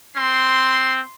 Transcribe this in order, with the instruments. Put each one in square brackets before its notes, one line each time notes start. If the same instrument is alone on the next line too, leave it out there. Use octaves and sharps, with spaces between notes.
[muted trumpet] C4 [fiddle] C6